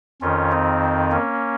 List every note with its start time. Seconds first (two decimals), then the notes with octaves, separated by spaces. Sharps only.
0.22 F2 D#3 C#4 F4
0.51 C4 D#4
1.11 A#3 C#4